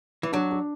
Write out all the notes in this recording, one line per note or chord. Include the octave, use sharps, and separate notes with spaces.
E3
F#3 D4
D4